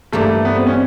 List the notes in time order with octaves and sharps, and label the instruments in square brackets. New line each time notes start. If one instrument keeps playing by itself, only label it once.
[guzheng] G2 E3 G3 A#3 [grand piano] A3
[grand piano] B3
C4
C#4